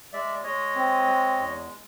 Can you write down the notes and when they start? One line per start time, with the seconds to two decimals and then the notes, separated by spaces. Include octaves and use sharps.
0.13 G#3 D5 E5
0.44 G#3 C#5 D#5
0.75 C4
1.07 G#3
1.37 E2